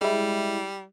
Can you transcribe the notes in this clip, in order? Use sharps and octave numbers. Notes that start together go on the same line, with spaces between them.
G3 G#3 E4